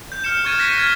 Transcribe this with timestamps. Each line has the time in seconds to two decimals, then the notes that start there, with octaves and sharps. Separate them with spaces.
0.12 G6
0.24 F6 G6 C#7 E7
0.45 C#6 F6 G#6 A6 D#7
0.58 F#6 G#6 A#6 B6 C#7
0.78 F6 G#6 A6